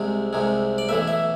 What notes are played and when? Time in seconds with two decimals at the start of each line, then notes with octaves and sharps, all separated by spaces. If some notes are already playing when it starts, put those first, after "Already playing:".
Already playing: C2 C3 G#3
0.33 C2 C3 G#3
0.78 D5
0.89 B1 A2 E3 E5
1.08 E5